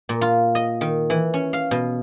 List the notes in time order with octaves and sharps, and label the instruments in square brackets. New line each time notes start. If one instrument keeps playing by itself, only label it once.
[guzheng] A#2
F4
D#5
D#3
E3
C#4
F5
B2